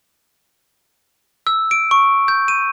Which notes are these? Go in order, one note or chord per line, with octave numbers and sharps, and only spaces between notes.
E6
D7
C#6
G6
D#7